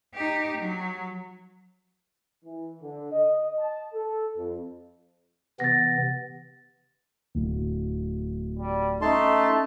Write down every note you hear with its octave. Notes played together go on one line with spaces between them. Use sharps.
D#4 G4
F#3
E3
D3
D#5
A5
A4
F2
C3 E3 B3 A6 A#6
D1
G3
A3 C#4 D#4 E5 A5 A#5 C6